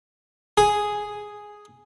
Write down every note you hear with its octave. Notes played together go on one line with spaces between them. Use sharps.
G#4